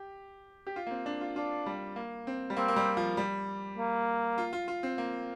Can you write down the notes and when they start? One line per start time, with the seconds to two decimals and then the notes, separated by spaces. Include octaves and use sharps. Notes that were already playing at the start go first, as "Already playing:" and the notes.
Already playing: G4
0.67 G4
0.76 F4
0.87 A#3
0.91 C4
1.06 D4
1.21 F4
1.36 D4 F4
1.66 G3
1.96 A#3
2.27 C4
2.50 G3
2.57 A#3 C4
2.68 A#3
2.76 G3
2.97 F3
3.17 G3
3.77 A#3
4.38 F4
4.53 F4
4.68 F4
4.83 C4
4.98 A#3